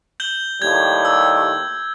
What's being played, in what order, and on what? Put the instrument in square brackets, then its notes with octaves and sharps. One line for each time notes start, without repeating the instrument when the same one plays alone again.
[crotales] G6 F#7 G7
[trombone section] D#2 A2 G3 [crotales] G#6
[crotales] E6